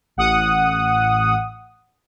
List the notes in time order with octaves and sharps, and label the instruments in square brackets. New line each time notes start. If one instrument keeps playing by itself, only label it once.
[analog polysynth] A1 F#5 D#6